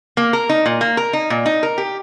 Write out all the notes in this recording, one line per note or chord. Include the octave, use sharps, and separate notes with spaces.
A#3
A#4
D#4
A#2
A#3
A#4
D#4
A#2
D#4
A#4
G4